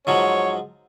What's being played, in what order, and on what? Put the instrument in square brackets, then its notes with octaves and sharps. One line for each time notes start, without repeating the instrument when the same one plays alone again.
[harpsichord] G#2 F3 F#3 [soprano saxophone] C#5